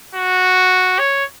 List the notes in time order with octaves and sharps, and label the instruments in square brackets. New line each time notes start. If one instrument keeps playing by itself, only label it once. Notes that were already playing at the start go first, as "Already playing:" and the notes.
[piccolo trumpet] F#4
C#5